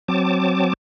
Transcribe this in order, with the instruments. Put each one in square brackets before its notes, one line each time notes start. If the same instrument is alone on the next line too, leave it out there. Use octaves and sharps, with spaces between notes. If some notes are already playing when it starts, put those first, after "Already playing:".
[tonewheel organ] F#3 C4 A5 D6